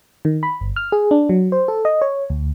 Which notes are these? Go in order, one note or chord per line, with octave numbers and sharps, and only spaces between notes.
D#3
B5
G1
F6
G#4
D4
F#3
C5
A4
D#5
C#5
D2